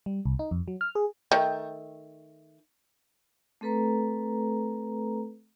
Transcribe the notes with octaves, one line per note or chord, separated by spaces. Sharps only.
G3
C2
D#4
F2
F#3
F6
G#4
D#3 A3
A3 C4 A4 B4 A#5